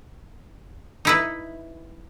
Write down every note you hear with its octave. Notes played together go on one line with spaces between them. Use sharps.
D#4 E4 B4